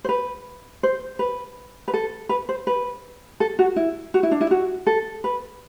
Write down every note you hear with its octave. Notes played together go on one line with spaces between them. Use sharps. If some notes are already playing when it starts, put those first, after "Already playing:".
C5
B4
C5
B4
B4
A4
B4
C5
B4
A4
F#4
E4
F#4
E4
D4
E4
F#4
A4
B4